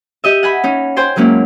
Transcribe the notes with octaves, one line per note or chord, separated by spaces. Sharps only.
G4 D#5 E5
F#5 G#5 B5
C#4 D#4
C5 G5 G#5 C6
F#3 G#3 A#3 C#4 E4